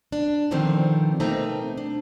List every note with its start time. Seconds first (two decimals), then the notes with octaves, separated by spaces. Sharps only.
0.12 D4
0.51 B2 D3 D#3 F3 C4
1.20 B2 A3 A#3 C4 D#4 A#5
1.78 D4